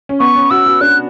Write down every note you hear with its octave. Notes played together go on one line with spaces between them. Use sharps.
C#4
B3 C#6
C#4
F#4 E6
F#4
D4 F#6